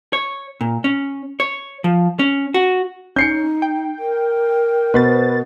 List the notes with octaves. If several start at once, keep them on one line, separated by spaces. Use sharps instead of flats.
C#5
A#2
C#4
C#5
F3
C#4
F#4
C#4 D#4 G6 C7 C#7
G5
A#4
B2 B4 C5 A6